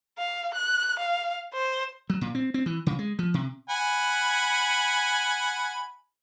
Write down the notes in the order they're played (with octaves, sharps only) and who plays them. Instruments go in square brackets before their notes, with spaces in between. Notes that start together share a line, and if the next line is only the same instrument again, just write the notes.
[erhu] F5
F#6
F5
C5
[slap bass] F#3
A#2
C4
C4
E3
C#3
G#3
F3
C3
[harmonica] F#5 G#5 B5